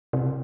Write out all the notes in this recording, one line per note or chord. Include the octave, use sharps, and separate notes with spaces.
C3